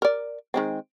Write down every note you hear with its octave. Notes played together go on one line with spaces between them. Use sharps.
A#4 D5
D#3 G#3 C4